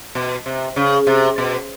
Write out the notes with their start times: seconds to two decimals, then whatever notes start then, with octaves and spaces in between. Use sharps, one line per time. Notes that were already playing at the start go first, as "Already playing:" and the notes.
0.15 B2
0.46 C3
0.76 C#3
1.07 C3
1.38 B2